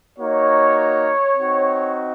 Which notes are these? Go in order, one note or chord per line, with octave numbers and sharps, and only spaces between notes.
A#3 D#4 F#4 C#5
C4 D#4 F#4